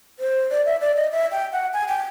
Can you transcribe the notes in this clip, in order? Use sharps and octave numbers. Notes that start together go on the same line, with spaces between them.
C5
D5
E5
D5
D#5
E5
G5
F#5
G#5
G5